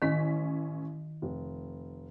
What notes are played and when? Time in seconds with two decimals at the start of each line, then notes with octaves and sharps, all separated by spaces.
0.02 A1 D#3 C#4 B6
1.22 F1